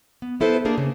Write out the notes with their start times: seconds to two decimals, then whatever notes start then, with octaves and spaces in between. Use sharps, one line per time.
0.22 B3
0.40 B3 E4 A4 B4 C5
0.65 A#3 D4 G#4 A#4
0.78 C#3